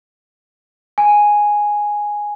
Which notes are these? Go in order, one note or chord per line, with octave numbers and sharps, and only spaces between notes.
G#5